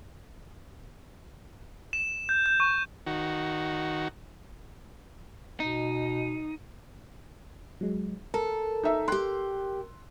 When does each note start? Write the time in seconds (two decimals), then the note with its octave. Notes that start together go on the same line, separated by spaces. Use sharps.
1.93 E7
2.29 G6
2.46 G6
2.60 C#6
3.07 D#3 F#4
5.60 B2 D#4
7.81 F#3 G#3
8.34 A4 A#4
8.83 D#4 E5 E6
9.08 G4 G5 C6 F#6